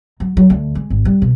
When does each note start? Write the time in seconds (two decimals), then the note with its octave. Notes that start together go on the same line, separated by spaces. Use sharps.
0.20 F#3
0.37 F#3
0.50 D2
0.75 G#3
0.90 G#1
1.05 G3
1.22 B2